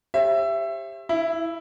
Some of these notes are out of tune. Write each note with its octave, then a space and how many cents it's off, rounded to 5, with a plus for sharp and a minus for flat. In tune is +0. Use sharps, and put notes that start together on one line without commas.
G4 +10 C5 +45 E5 +20
E4 +0 E5 +45